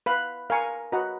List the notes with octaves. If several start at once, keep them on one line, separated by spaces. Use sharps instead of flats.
B4 F5 B5
A#4 F5 G#5 C#6
F#4 B4 D#5 F#5 A#5